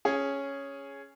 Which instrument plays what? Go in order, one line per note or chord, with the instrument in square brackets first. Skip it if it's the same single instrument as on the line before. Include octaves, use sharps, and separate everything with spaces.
[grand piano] C#4 G#4